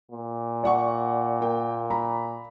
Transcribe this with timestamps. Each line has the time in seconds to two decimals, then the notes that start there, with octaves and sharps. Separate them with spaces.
0.11 A#2
0.64 D5 F#5 C#6
1.40 A#3 A#4 G5
1.90 A#5 B5